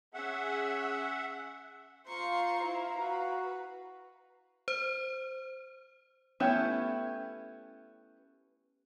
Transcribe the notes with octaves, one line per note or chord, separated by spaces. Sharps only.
C#4 G#4 E5 F#5
F4 C5 F5 A#5 C6 C#6
E4 C5
F#4 B4
C5
A3 B3 C#4 E4 G4